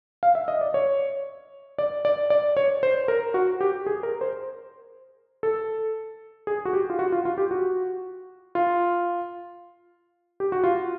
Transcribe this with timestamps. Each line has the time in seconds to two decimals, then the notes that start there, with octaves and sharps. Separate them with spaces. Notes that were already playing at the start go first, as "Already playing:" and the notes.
0.23 F5
0.35 E5
0.48 D#5
0.61 D5
0.74 C#5
1.78 D5
2.05 D5
2.30 D5
2.57 C#5
2.83 C5
3.08 A#4
3.34 F#4
3.61 G4
3.86 G#4
4.03 A#4
4.21 C5
5.43 A4
6.47 G#4
6.65 F#4
6.73 G4
6.90 F4
6.99 F#4
7.12 F4
7.25 F4
7.38 G4
7.51 F#4
8.55 F4
10.40 G4
10.52 F#4
10.64 F4